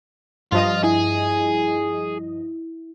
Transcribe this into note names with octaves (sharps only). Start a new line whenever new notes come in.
G2 F3 F4 D#5 F5
E4 G#4